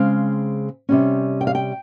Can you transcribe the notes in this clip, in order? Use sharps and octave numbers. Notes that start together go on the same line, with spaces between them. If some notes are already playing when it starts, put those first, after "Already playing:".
Already playing: C#3 G#3 C4 F5
C3 G3 C#4
G5
F5
G5